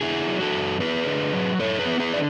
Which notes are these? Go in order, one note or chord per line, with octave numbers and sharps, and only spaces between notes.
D3 E4 G#4
F#3
F#4 A4
F#2
B3 G#4 B4
D3
F#3
F#2 A4 C#5
G#4 B4
B3
G#4 B4
D3 D5